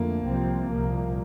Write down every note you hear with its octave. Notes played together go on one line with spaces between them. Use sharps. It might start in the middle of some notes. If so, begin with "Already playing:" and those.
Already playing: F2 D3 A3 A#3
C2 C3 F3 C4
C2 A#2 F3 A#3